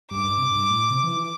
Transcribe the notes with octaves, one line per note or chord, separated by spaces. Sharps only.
G2 D6
G2
C3
G2
A2
C3
E3
E3